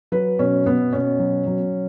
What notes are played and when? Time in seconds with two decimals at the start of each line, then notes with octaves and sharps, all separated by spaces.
0.12 F#3 B4
0.39 B2 C#4
0.66 B2 B3
0.93 B2 C#4
1.19 F#3
1.46 F#3